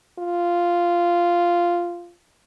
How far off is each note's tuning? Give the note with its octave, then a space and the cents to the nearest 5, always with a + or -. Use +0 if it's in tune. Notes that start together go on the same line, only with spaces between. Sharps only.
F4 -5